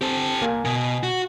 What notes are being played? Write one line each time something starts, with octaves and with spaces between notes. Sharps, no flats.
C4 G4 A4
C2 A#3 G#5
B2 G#5
F#4